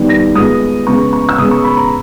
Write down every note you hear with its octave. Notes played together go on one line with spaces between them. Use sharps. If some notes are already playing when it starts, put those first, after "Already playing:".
Already playing: D#3 G3 B3
A#6
A#2 G#3 B3 D#6
C#3 G#3 B3 C#6
C#6
E6
C#3 G#3 B3 D#6
C#6
B5
A#5